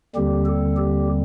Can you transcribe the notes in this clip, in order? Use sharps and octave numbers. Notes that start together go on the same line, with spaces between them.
D#2 D3 G3 C4 G4
A4
G4